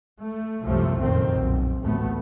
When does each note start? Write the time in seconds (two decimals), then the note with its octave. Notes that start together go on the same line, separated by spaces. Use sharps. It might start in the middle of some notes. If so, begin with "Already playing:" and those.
0.21 A3
0.65 C2 F#2 C3 F3 A3
1.02 F#1 F2 A#2 D#3 C4
1.36 B1
1.82 A1 D2 A2 A3 B3